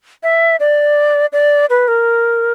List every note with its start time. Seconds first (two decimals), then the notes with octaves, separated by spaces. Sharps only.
0.23 E5
0.60 D5
1.33 D5
1.70 B4
1.88 A#4